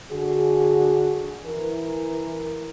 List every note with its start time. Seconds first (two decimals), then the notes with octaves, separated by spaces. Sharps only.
0.11 D3 F#4 G#4
1.45 E3 A#4